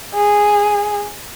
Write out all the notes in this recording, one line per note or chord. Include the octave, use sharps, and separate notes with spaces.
G#4